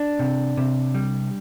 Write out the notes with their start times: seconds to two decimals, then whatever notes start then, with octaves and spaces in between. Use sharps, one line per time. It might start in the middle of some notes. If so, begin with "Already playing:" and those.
Already playing: D4
0.19 C3
0.57 C3
0.95 G3